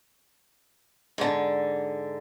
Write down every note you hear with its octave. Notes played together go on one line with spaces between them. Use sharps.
G#2 D3